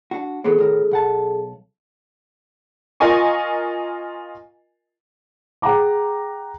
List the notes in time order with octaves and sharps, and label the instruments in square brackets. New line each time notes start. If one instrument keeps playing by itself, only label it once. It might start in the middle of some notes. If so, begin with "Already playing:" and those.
[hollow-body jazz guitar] D4 F#4
[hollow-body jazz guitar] E3 B3 C4 [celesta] G#4 A4
[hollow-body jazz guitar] A2 D#3 A#4
B1 F#5 A5
[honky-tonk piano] F4 A#4 D#5 G#5 C#6
[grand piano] G#4 F#5 G5 A#5 D6